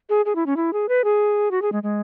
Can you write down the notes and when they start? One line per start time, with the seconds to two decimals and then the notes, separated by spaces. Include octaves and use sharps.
0.10 G#4
0.26 G#4
0.36 E4
0.46 C#4
0.57 E4
0.73 G#4
0.89 B4
1.04 G#4
1.51 F#4
1.62 G#4
1.72 G#3
1.83 G#3